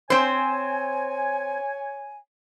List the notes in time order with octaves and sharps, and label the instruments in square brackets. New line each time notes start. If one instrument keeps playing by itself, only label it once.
[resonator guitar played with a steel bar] C4 C5 [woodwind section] C#5 G#5